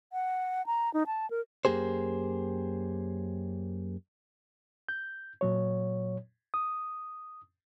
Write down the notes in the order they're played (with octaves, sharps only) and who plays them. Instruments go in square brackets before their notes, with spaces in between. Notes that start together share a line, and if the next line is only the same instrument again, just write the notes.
[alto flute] F#5
A#5
D#4
A5
A#4
[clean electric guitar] F#2 A#3 G4 G#4 C5
[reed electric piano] G6
A#2 F#3 C#5
D#6